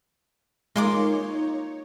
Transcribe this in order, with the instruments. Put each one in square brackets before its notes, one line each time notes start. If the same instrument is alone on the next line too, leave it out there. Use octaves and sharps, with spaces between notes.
[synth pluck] G#3 C6 D6 [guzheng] A#3 F4 [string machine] D#4 C#5